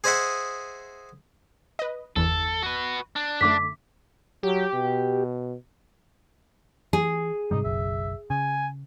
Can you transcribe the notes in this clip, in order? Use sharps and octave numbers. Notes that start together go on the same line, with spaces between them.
G#4 C5 D#5 E5 F#5
B4 D#5
G1 E2 E3 A4
F#4 B4
D4
F#2 D3 A3 D6 B6
F#3 G4
B2
E3 G#4
G#2 C3 G3 D#4
F#1 B1 F#2 E5
C#3 G#5